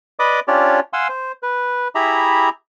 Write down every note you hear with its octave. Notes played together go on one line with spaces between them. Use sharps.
B4 D5 D#5 B5 D6 D#6
C#4 D4 F4 G4 C#5 D5
F5 F#5 G#5 C6 E6
C5
B4
E4 G4 G#4 E5 A#5 B5